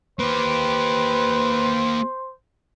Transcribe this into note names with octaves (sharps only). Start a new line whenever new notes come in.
A#3 G4 B4 C5